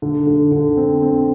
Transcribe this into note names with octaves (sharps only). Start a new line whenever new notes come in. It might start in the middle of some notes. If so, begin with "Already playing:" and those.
D3
D3
D3
C4
C4